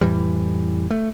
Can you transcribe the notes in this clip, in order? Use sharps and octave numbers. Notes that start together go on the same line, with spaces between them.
F2 A2 E3 G3
A3